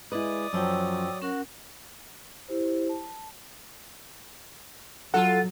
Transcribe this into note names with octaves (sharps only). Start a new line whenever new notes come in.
G#3 E4 B4 D5 D#5 D#6
F#2 F3 F#3 G5 E6
C#4 F#4 A#4 F#5
E4 G4 C5
A5
F#3 F4 A4 F#5